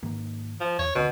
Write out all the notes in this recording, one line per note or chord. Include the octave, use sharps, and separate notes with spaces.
G#2 D#3 A#3
F3
E2 C#5
D2 B2 D3 C4